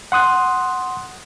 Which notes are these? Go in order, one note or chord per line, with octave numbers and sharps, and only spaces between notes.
F#5 C6 D#6 F#6